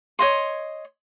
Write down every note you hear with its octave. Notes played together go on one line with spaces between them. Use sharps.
C#5 D#5 C6